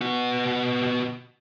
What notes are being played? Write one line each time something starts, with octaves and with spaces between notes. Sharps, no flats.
B3 F#4